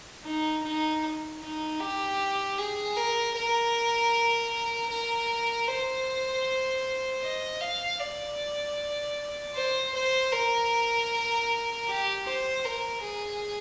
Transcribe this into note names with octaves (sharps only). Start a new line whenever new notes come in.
D#4
D#4
D#4
G4
G#4
A#4
A#4
A#4
C5
D#5
F5
D5
C5
C5
A#4
G4
C5
A#4
G#4